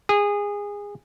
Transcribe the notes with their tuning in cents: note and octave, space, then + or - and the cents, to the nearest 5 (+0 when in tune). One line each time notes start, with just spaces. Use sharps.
G#4 -20